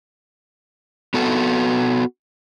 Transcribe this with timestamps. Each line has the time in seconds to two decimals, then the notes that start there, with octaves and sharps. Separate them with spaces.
1.14 B3 F#4 A4